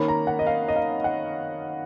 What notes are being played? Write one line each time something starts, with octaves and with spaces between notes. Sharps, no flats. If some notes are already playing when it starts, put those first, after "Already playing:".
Already playing: D#3 A#3 C#4 B5
A#5
F#5
D#5
F5
D#5
F5
F#5